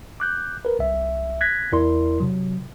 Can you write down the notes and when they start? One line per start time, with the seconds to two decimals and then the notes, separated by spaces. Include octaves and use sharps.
0.20 D6 F#6 G6
0.65 A#4 B4
0.79 C2 E5
1.41 F#6 G#6 A#6 B6
1.72 E2 E4 A#4 D5 C6
2.20 C3 F#3